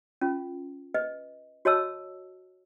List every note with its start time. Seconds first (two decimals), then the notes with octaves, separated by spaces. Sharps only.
0.21 C#4 F4
0.94 B4 D#5
1.65 F#4 C#5 D#5 A5 E6